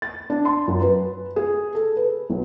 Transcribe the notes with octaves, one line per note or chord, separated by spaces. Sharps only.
A6
D4
C6
F#2
B4
G#4
A4
B4
B1